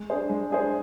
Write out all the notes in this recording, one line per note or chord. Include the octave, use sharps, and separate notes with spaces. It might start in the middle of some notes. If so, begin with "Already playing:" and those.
Already playing: G#3
D4 G#4 C5
G#3
D4 G#4 C5